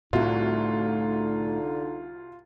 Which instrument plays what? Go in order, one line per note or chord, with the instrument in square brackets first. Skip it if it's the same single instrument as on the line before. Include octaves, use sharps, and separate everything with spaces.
[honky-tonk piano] C2 F#4 E5 [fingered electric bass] A2 A3 [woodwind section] D3 D#4 [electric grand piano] F4